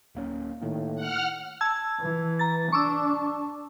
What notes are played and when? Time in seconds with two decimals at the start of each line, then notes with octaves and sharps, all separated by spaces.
0.15 D1 A#3 C#4
0.62 A2 D#3 A#3
0.96 F#5 F6
1.61 A5 E6 G#6
2.00 E3
2.39 A#5 A6
2.72 D4 C#6 D6 E6